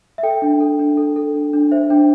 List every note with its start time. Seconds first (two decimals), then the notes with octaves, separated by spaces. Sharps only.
0.18 E5
0.23 A4 G5
0.42 D4
0.60 A4
0.79 D4
0.97 A4
1.16 A4
1.34 D4
1.53 D4
1.71 C5 E5
1.90 D4 G5